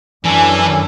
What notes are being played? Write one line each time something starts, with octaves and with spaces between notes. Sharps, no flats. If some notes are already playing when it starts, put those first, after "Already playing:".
F#2 E3 C#4 D4 A4 G#5